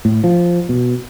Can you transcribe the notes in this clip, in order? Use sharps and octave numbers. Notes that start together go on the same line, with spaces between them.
A2
F3
B2